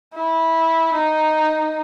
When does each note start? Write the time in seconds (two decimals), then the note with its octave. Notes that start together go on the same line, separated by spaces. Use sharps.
0.15 E4
0.94 D#4